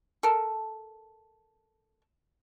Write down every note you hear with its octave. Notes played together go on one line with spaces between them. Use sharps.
A4 A#4